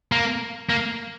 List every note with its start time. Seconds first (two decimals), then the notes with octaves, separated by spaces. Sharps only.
0.12 A#3
0.70 A#3